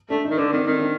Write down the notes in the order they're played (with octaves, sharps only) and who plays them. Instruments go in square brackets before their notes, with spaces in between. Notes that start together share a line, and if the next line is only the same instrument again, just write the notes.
[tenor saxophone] A3 [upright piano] D4
[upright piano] D#4
[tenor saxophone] D#3
[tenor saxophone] D3 [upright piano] D4
[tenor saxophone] D#3 [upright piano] C4
[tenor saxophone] D#3 [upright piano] C4
[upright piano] D4